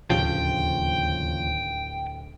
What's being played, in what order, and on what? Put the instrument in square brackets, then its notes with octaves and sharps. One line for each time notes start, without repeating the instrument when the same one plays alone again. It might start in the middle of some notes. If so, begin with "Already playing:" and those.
[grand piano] D1 G4 [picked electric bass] D#2 C#3 F3 [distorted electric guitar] G5